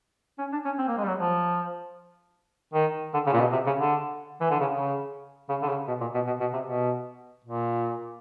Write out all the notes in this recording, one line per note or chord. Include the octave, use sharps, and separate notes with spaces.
C#4
D4
C#4
C4
A#3
G#3
G3
F#3
F3
D#3
D3
C#3
A#2
B2
C3
C#3
D3
E3
D3
C#3
C#3
C#3
D3
C#3
B2
A#2
B2
B2
B2
C3
B2
A#2